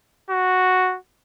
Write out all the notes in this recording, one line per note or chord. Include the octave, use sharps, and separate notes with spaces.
F#4